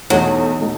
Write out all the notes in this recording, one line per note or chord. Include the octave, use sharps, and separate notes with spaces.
E2 B2 F#3 A3 D#4
B2 A3 D#4